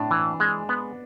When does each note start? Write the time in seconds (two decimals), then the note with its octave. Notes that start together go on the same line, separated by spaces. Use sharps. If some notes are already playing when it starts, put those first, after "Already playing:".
Already playing: A2 D4
0.11 E3
0.40 G#3
0.69 B3